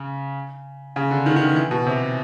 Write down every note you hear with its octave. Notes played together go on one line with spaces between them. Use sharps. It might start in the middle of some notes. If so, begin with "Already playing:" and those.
Already playing: C#3
C#3
D3
D#3
D#3
E3
E3
B2
C3